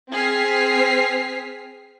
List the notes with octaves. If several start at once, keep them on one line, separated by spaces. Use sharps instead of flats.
C4 G#4 F6 B6 C7